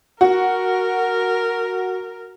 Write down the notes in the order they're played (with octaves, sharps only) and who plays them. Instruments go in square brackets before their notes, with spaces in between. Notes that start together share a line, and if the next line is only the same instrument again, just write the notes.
[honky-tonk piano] F#4 [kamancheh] A#4